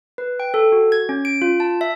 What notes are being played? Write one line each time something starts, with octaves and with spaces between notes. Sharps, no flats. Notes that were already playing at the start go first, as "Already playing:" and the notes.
B4
G5
A4
F#4
G#6
C#4
D7
F4
A5
E5